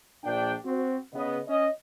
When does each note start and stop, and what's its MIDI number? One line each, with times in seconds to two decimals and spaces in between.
0.24 0.54 34
0.24 0.54 62
0.24 0.54 79
0.65 0.96 60
0.65 0.96 66
1.14 1.39 49
1.14 1.39 59
1.14 1.39 75
1.48 1.68 61
1.48 1.68 75